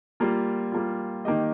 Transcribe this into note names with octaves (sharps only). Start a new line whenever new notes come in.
G3 A#3 F4
G3 A#3 F4
D#3 A#3 G4 D#5